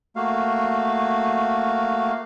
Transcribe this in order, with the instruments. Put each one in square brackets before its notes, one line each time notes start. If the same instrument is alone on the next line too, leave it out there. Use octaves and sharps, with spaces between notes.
[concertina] A3 A#3 F#4 F5